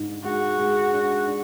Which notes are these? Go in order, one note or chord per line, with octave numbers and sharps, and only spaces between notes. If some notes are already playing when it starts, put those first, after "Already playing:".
Already playing: G#2 D4
G#3 F#4
G#3
D4
D4